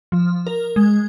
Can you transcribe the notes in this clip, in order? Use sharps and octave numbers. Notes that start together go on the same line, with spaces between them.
F3
A#4
G#3